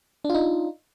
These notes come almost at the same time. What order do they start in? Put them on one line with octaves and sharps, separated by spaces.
D4 F4 D#4